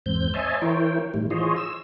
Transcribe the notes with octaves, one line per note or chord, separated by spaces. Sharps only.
E2 G#2 C4 G6
C5 C#5 D#5 E5 G#5 A5
E3 E4 A#4 C5 C#5 G5
A2 D#3 G3
E3 F4 G#4 C5 C#5 D#5
E6